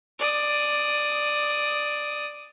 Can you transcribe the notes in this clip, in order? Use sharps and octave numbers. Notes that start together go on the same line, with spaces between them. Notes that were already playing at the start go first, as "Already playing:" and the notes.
D5 D#6